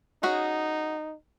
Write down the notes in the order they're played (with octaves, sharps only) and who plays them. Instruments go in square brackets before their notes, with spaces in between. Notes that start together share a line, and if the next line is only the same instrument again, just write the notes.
[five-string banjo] C#4 F#4 G#4 [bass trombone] D#4